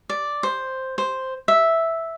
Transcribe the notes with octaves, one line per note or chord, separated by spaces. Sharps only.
D5
C5
C5
E5